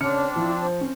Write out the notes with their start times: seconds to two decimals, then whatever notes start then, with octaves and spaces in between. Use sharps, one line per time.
0.01 C#3 C4 D4 C#5 F6 C#7
0.36 F3 E4
0.61 C5
0.81 C4 C#4